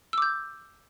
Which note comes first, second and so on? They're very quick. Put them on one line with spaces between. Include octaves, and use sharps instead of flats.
E6 D6 G6